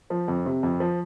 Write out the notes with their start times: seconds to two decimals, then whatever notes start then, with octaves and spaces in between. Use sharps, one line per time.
0.10 F3
0.28 F2
0.46 C3
0.63 F2
0.80 F3